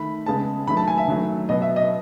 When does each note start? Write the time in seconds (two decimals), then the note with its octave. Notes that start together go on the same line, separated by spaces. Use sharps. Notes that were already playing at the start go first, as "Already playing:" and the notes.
Already playing: D#3 A3 B5
0.26 C#3 G#3 B3 A5
0.68 D#3 F#3 A3 B5
0.77 A5
0.88 G#5
0.98 E5
1.08 D#3 F#3 A3
1.49 B2 F#3 B3 D#5
1.62 E5
1.76 D#5